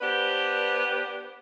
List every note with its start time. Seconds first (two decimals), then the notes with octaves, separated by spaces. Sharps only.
0.01 B3 D4 G4 B4 C5